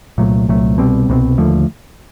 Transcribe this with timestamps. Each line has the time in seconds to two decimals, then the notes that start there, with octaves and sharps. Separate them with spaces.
0.18 C2 A#2 F#3 A3
0.48 C2 A#2 F#3 A3
0.78 C2 B2 G3 C4
1.09 C2 B2 G3 C4
1.38 D#2 D3 F3 A3